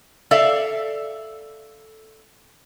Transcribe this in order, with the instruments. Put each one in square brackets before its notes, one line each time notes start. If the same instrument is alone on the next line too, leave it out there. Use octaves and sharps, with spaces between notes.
[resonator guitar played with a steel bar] A4 D5 E5 F5